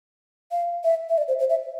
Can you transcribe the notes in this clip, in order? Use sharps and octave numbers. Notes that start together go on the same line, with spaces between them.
F5
E5
E5
D5
C5
C5
E5